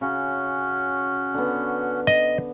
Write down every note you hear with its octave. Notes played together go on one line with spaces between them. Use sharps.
C#3 C#4 F#4
D3 B3
D#5